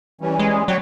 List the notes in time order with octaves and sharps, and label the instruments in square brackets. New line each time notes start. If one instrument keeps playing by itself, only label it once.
[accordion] E3 G3 C#4
[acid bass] G#3
[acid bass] F#3 [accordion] C#5 D5 G5